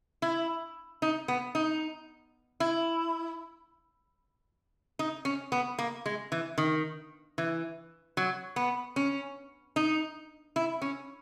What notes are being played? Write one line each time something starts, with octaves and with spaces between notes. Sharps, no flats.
E4
D#4
B3
D#4
E4
D#4
C#4
B3
A#3
G#3
E3
D#3
E3
F#3
B3
C#4
D#4
E4
C#4